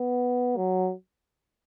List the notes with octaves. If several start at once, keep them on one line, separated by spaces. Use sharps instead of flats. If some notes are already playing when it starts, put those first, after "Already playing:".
Already playing: B3
F#3